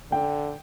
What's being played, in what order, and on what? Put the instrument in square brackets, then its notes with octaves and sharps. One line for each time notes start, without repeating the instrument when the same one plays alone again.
[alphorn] D3 [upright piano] G5